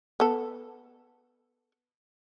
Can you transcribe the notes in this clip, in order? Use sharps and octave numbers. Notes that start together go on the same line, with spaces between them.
B3 A4